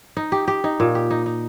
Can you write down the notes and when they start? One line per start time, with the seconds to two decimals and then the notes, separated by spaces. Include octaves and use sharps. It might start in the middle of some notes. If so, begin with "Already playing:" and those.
0.17 D#4
0.32 G4
0.48 G4
0.64 D#4
0.80 A#2
0.95 G4
1.10 D#4
1.26 D#4